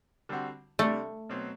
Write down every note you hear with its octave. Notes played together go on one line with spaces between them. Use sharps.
D3 G3 C4 F#4
C3 G3 A3 D4
B2 F#3 C4